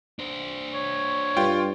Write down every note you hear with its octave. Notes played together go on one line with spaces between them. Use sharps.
D4 C5
C#5
G2 F4 G5